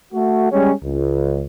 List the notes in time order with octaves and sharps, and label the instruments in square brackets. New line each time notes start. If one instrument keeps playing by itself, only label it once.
[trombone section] A3 F#4
G3 G#3 C#4
C#2